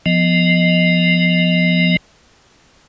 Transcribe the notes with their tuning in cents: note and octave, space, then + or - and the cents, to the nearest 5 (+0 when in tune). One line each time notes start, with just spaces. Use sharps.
F3 +0 B3 +0 D#5 +0